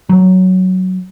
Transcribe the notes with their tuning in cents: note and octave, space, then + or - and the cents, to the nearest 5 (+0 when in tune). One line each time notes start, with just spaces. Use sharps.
F#3 +5